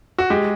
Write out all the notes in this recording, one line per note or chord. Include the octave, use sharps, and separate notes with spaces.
F#4
G#3 G4